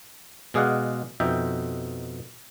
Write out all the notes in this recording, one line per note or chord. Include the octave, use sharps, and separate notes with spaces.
B2 G#3 G#4 D5 F5 F#5
F2 B2 D#4 E5 G5